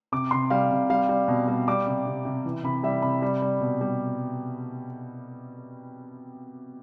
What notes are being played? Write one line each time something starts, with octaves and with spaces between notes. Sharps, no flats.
C3 D6
C3 C6
G3 F5
C3
G3 F5
G3
B2
G3
G3 D6
C3
C3
C3
E3
C3 B5
G3 E5
C3 B5
G3
G3
B2
G3